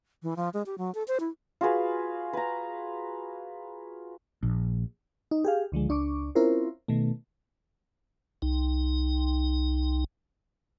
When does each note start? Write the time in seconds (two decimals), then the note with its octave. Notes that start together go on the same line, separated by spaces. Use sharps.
0.23 E3
0.36 F3
0.54 G#3
0.66 G4
0.78 F#3
0.95 A4
1.08 C5
1.20 E4
1.61 F4 F#4 G#4 B4
2.33 B4 A#5
4.43 A#1
5.31 D#4
5.44 G4 G#4 F5
5.72 C#2 D3 F3 G#3
5.89 C#2 D4 C#6 D6
6.35 C4 C#4 E4 F4 A#4 C5
6.88 B2 D#3 A3
8.42 C2 D#4